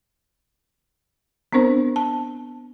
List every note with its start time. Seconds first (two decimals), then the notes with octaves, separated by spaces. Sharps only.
1.53 B3 C4 D4 A#4 C5
1.96 A5